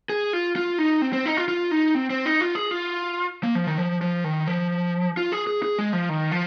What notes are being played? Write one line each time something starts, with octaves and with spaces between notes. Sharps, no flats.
G#4
F4
F4
D#4
C4
C4
D#4
F4
F4
D#4
C4
C4
D#4
F4
G#4
F4
A#3
F3
D#3
F3
F3
D#3
F3
F4
G#4
G#4
G#4
G#3
F3
D#3
F3